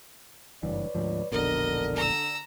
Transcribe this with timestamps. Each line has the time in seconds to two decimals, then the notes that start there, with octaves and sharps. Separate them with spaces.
0.63 F#1 G2 E3 B4 C#5 D5
0.95 D2 G#2 F3
1.32 E1 A#1 B2 D3 A#4 D#5
1.96 A#5 E6